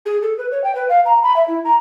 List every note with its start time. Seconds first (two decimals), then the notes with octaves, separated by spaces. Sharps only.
0.06 G#4
0.23 A4
0.38 B4
0.52 C#5
0.64 G5
0.75 B4
0.89 F5
1.06 A#5
1.23 B5
1.36 E5
1.48 E4
1.65 A#5